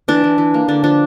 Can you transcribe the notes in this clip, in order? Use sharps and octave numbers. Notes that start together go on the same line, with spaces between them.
E3 D4
E3
E3
A#3
D3 D4
F3 D4